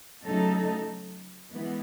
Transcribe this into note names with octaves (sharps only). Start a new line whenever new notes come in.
C#3 F#3 A3 D#4 A4
E3 G#3 B3